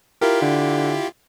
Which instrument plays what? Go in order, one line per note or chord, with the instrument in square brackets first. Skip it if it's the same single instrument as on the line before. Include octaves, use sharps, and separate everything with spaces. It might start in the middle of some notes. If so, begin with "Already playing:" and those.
[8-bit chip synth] E4 F4 G4 [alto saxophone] A#4
[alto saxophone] D3